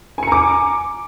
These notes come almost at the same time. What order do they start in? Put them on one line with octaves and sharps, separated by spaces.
G#5 C#7 A#5 D6